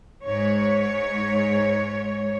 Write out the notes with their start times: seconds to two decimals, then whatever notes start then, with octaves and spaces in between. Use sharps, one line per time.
0.24 G#2 C#5